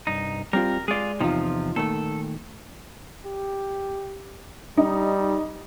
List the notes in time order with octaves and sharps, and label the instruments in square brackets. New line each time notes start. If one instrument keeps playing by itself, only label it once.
[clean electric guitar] C2 G2 D#4
[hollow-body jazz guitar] G3 C4 F4 [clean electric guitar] A#4
[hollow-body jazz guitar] G#3 D5 [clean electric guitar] F4 G#4
[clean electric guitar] E2 C3 F3 [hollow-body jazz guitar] D#4 F4
[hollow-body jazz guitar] A#2 D#3 A3 [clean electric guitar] A4
[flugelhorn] G4
[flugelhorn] G3 [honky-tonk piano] D#4